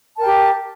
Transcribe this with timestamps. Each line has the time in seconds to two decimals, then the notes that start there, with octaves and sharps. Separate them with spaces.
0.16 A5
0.19 A#4
0.23 G5
0.26 G4